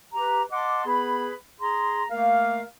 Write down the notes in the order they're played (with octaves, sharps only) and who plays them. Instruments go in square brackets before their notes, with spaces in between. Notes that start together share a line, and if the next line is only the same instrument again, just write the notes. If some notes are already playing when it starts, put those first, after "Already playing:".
[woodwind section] G4 B4 A#5
D#5 F#5 A5 C6 D6
B3 G#4 B4 B5
G#4 A#5 C6
A3 A#3 A#4 F5